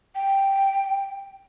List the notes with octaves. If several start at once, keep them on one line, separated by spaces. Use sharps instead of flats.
G5